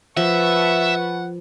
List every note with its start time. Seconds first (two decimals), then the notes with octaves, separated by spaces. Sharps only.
0.17 F3 B4 E5 F#5 A5 C#6